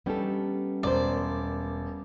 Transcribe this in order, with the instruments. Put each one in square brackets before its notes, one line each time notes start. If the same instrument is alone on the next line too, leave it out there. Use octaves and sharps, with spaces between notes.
[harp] G3 C#4 G4 [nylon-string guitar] B3 D#4 A4
[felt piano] E1 [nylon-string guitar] B3 A#4 C5 [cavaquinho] D5